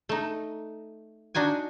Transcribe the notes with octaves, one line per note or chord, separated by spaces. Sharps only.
A3 D#4
D4 D#4 F#4 G#5